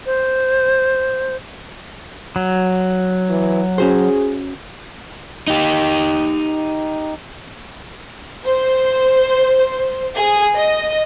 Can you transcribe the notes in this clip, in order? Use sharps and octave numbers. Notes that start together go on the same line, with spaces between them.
C5
F#3
E3
C#4 F#4 G#4 C5
D#4 G4
C5
G#4
D#5